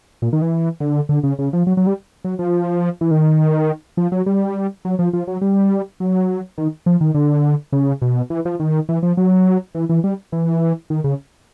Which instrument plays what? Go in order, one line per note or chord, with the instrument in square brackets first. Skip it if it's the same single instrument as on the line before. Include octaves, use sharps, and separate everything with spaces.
[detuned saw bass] A#2
D#3
E3
D3
D3
C#3
C#3
F3
F#3
F#3
G3
F#3
F3
E3
D#3
F3
F#3
G3
F#3
F3
F3
F#3
G3
F#3
D#3
F3
D#3
D3
C#3
B2
E3
F3
D#3
E3
F3
F#3
E3
E3
G3
E3
D#3
C#3